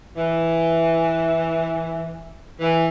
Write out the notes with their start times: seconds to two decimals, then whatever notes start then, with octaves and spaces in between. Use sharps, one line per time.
0.17 E3
2.60 E3